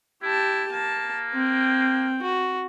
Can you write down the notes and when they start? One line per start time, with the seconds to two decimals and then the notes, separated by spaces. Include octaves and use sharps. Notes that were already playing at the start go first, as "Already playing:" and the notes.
0.23 E4 G4 A5
0.72 A#3 A5
1.34 C4 G5
2.22 F#4